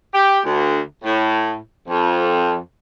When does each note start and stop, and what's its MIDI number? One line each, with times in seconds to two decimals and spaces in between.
0.14 0.40 67
0.45 0.81 38
1.04 1.57 45
1.88 2.58 41